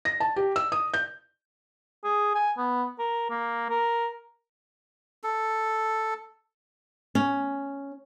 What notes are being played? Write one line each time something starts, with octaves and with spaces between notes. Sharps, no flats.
A#6
A5
G4
E6
D#6
G6
G#4
G#5
B3
A#4
A#3
A#4
A4
C#4